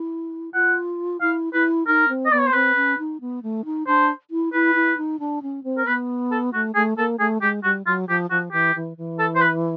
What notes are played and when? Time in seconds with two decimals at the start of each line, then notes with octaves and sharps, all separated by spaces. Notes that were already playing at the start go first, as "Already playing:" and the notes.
Already playing: E4
0.53 F4 F#5
1.21 E4 F5
1.53 E4 B4
1.87 D#4 A#4
2.09 C4
2.26 D#5
2.32 B3 D5
2.39 C#5
2.47 C5
2.53 C4 B4
2.75 C#4
2.98 D#4
3.21 B3
3.43 A3
3.65 D#4
3.87 D4 C5
4.31 E4
4.53 E4 B4
4.75 E4
4.97 D#4
5.19 D4
5.42 C#4
5.64 C4
5.78 A#4
5.86 B3 B4
6.31 A4
6.54 A3 F#4
6.75 A3 G#4
6.97 A#3 A4
7.19 A3 G#4
7.41 G#3 G4
7.63 G3 F#4
7.85 F#3 F4
8.08 F3 G4
8.30 F3 F#4
8.52 E3 G4
8.75 E3
8.97 E3
9.19 A4
9.36 C5
9.41 B4